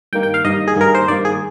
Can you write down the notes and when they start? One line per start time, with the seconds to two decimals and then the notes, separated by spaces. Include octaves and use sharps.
0.13 G2 D#3 A#3 G5
0.23 G5
0.34 F5
0.45 G2 D#3 A#3 D#5
0.68 G#4
0.76 G2 D#3 A#3 A#4
0.95 C5
1.08 G2 D#3 A#3 D5
1.25 G#4